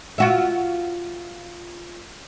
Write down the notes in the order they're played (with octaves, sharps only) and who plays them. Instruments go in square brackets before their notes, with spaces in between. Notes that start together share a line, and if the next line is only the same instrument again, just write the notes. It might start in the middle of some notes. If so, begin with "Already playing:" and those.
[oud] F4 F#4 E5